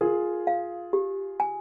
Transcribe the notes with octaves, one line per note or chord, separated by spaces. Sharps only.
F4 G#4 A#4
F5
G4
G#5